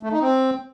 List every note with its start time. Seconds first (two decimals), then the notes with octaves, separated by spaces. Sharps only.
0.03 A3
0.12 D#4
0.21 C4